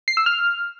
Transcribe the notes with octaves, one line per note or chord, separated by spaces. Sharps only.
C7
E6
F6